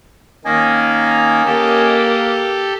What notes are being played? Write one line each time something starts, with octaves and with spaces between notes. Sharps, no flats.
D#3 A#3 C#4 D#5 G#5
A#3 G4 A4